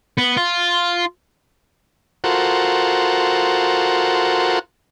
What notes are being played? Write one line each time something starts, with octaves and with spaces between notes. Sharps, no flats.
B3
F4
F4 F#4 A4 A#4 C5 F#5